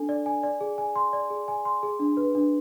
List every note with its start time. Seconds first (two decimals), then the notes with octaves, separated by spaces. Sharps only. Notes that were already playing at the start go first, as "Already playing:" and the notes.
Already playing: D4 A4 G#5
0.09 D5
0.26 G#5
0.43 D5
0.61 G#4
0.78 G#5
0.95 C6
1.13 D5
1.30 G#4
1.48 G#5
1.65 C6
1.83 G#4
1.99 D4
2.17 B4
2.35 D4